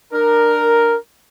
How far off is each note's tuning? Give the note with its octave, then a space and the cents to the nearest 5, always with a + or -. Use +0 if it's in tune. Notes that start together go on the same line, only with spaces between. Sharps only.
D4 +25 A#4 +0